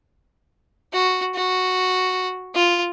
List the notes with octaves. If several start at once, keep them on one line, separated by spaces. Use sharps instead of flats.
F#4
F#4
F4